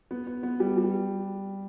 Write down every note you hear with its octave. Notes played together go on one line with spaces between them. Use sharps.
B3
B3
B3
G3
G3